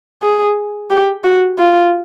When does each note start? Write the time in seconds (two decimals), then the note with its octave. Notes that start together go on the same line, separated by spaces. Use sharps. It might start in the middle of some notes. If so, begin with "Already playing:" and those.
0.22 G#4
0.90 G4
1.24 F#4
1.58 F4